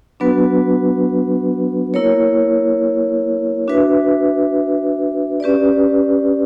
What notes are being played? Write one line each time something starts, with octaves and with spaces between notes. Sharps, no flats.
F#3 B3 D4 F#4 B4
A#3 E4 A#4 C#5
D4 F#4 B4 E5
C#4 G4 B4 D5